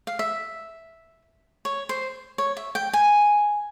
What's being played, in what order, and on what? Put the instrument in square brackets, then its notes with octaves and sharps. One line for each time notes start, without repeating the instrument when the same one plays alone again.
[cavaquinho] F5
E5
C#5
C5
C#5
E5
G5
G#5